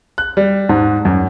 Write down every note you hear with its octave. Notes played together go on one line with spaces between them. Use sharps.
F#6
G3
G#2
F#2